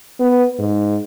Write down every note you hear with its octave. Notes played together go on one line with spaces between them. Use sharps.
B3
G#2